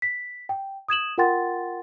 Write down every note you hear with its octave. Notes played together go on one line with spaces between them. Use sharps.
B6
G5
D#6 G#6 E7 F#7
F4 A#4 F#5 G5 C6 A6